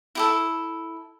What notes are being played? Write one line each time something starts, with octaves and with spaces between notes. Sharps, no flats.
E4 G4 A4